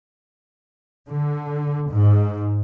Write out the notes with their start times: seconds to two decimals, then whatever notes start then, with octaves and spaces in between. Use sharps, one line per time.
1.07 D3
1.89 G#2